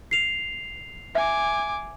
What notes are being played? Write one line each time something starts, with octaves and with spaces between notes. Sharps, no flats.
C7 F7
E5 G#5 D6